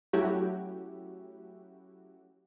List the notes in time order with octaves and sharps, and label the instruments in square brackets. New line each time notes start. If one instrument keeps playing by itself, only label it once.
[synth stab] F#3 A3 C#4 E4 F#4 G4